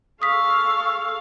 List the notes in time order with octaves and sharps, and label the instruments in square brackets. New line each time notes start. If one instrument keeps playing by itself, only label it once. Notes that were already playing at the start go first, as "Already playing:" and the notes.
[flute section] G#4 C#6 E6 [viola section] A4 F5 [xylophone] D#6 B6